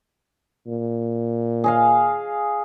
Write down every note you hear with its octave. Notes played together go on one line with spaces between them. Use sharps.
A#2
G#4 D#5 F5